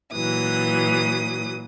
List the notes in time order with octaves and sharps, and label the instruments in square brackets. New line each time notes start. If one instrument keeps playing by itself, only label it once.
[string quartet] A#2 E3 F#3 D#6